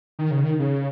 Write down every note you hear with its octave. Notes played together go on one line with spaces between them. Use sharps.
D#3
C#3
D#3
C#3